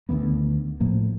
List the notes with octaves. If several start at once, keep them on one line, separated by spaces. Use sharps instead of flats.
D2 D#3 A#3 B3
A2 F3 A3 A#3